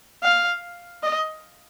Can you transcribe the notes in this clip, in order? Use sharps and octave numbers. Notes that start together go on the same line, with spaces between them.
F5
D#5